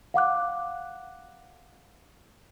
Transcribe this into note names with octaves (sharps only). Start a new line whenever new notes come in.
F5 F#5 D6 F#6